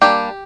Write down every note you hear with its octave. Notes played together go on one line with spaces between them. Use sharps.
G3 A#3 D4 G4